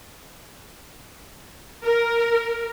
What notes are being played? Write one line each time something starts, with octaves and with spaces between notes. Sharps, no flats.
A#4